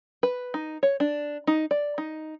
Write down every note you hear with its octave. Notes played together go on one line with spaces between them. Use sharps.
B4
D#4
C#5
D4
D#4
D5
D#4